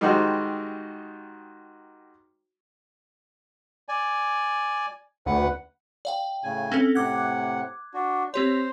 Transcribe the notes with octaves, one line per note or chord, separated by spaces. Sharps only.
D#3 G3 G#3 D#4 F#4 C5
D5 G#5
D2 B4 F#5
D5 F5 G5
A2 C#3 G#5
C4 C#4 A4
A2 C3 F#5 D6 F#6 G#6
D4 F#4
C4 G4 C5 C#5